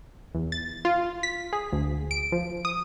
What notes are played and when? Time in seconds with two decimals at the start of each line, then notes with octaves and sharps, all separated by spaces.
0.35 E2
0.52 A6
0.85 F4
1.23 B6
1.53 G#4
1.72 D2
2.11 D7
2.32 F3
2.65 D#6